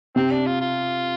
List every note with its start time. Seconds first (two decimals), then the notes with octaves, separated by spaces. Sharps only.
0.16 C3 C4
0.31 D4
0.46 F4
0.61 F4